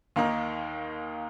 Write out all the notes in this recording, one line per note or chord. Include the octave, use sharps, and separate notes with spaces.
D#2 D#3 A#3 D#4